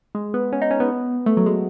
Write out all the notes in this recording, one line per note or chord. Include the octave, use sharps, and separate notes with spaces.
G#3
B3
C#4
D#4
C#4
B3
A3
F#3
G#3